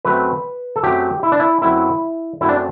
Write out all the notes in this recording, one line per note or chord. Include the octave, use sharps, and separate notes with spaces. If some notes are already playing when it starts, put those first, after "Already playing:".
F#2 F#3 A3 C4 B4
A4
F#2 F#3 A3 C4 G4
E4
D4
E4
F#2 F#3 A3 C4 E4
F#2 F#3 A3 C4 E4
D4